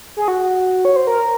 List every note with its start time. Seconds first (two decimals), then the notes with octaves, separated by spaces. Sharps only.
0.17 G#4
0.28 F#4
0.85 C#5
0.96 C5
1.07 A#4